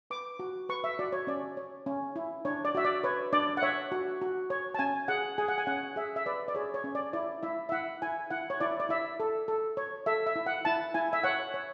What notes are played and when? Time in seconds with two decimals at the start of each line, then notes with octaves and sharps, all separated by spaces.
0.10 B4 D6
0.39 F#4
0.69 B4 C#6
0.84 E5
0.99 F#4 D5
1.13 C#5
1.27 C#4 D5
1.57 C#5
1.86 C#4
2.16 E4
2.45 D4 C#5
2.65 D5
2.75 F#4 E5
2.85 D5
3.04 B4 C#5
3.33 D4 D5
3.57 F#5
3.62 C#5 E5
3.92 F#4
4.21 F#4
4.50 C#5
4.74 A5
4.79 C#4 G#5
5.08 G#4 F#5
5.38 G#4 G#5
5.48 F#5
5.58 G#5
5.67 C#4 F#5
5.96 G#4 E5
6.16 E5
6.26 B4 D5
6.48 D5
6.55 G#4 C#5
6.74 C#5
6.84 C#4
6.95 D5
7.13 E4 D5
7.43 E4 E5
7.69 E5
7.72 E4 F#5
8.02 E4 G#5
8.31 E4 F#5
8.50 C#5
8.60 E4 D5
8.80 D5
8.89 E4 E5
9.20 A4
9.48 A4
9.77 C#5
10.06 A4 E5
10.26 E5
10.36 E4
10.46 F#5
10.65 E4 A5
10.94 E4 G#5
11.13 E5
11.24 C#5 F#5
11.54 C#5